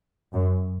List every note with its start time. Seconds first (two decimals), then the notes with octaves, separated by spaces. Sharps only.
0.33 F#2